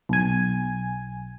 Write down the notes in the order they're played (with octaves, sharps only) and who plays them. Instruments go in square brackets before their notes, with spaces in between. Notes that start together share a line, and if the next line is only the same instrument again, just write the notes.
[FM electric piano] B1 G#5